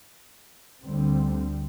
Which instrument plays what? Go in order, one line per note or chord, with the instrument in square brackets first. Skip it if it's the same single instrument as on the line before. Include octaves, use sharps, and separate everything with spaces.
[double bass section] D2 D3 G3 C4